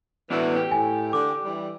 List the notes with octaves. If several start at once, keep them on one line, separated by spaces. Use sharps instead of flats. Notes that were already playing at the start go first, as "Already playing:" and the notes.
A2 E3 B3 D4 F#4
G4
A2 G#5
D3 D6
E3 G3